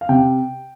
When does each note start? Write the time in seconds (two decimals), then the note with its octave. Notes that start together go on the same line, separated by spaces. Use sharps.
0.01 F5
0.09 C3 G5